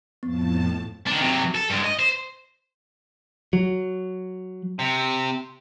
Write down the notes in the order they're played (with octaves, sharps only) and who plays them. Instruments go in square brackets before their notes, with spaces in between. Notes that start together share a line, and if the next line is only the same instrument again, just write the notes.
[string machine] F2 A2 A5 [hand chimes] B3
[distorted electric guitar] D#3 D4
C3 F#3
A4
G2 G#3
D#5
C5
[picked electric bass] F#3
[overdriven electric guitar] C3